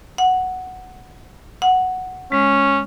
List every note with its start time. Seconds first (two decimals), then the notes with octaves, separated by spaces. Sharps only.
0.18 F#5
1.62 F#5
2.32 G#3 C#4